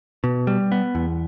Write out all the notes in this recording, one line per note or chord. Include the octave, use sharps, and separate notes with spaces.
B2
G3
B3
E2